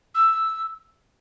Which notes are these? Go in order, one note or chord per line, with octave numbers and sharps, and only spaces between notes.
E6